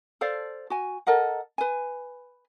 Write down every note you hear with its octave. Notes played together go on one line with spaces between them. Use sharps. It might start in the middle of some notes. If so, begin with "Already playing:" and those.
A4 C5 D5 F5
F#4 G#5
A4 A#4 D#5 F#5
B4 G#5